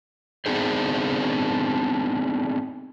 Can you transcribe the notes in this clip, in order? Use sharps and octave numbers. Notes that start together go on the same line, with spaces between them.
B3 C4 D4 D#4 G#4 C5